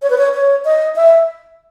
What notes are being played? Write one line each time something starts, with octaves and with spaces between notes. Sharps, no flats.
C#5
B4
C#5
C#5
D#5
E5